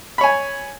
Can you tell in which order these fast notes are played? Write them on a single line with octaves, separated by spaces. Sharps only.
B5 C#5 G#5